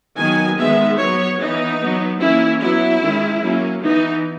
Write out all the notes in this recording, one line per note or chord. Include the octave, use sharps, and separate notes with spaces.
D#3 F#3 B3 G#5
D#3 G#3 B3 E5
F#3 B3 C#5
E3 B3 D#4
F#3 B3
E3 A#3 C#4 E4
F#3 B3 E4
D#3 G#3 C#4
F#3 A#3 C#4
E3 B3 D#4